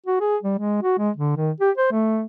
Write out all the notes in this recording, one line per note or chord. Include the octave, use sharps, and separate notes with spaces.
F#4
G#4
G3
G#3
F#4
G#3
D3
D#3
G4
C5
A3